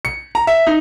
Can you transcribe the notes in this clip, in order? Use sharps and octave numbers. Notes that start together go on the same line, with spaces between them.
C#7
A#5
E5
D#4